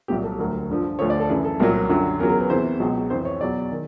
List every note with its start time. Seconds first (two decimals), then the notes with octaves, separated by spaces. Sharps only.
0.08 C2 A#2 F#3 G4
0.24 A4
0.38 D2 D3 F#3 A#4
0.69 G2 D3 F3
0.99 D2 D3 F3 C#5
1.10 D5
1.20 A4
1.30 F#2 C#3 E3 G#4
1.44 A4
1.60 C2 A#2 F#3 A#4
1.89 F#2 D3 F#3
2.19 E2 C#3 F#3 A#4
2.29 A#4
2.41 B4
2.50 E2 C3 E3 C5
2.80 C#2 B2 F#3
3.10 F2 C3 E3 C5
3.25 C#5
3.41 E2 B2 F#3 D5
3.72 D#3